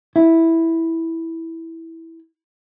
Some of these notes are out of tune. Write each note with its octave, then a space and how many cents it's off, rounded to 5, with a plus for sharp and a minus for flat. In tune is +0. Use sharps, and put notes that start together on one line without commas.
E4 -5